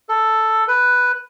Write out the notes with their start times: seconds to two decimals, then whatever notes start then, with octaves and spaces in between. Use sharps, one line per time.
0.09 A4
0.68 B4